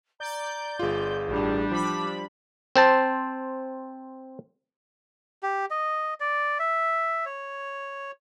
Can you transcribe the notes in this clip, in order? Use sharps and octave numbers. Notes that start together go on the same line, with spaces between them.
D5 A#5 G6
G1 F4 G#4
A1 G3 D4
F3 B5 D6
C4 C5 A5
G4
D#5
D5
E5
C#5